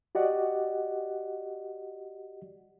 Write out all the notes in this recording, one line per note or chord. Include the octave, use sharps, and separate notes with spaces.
F#4 G4 D5 D#5 F#5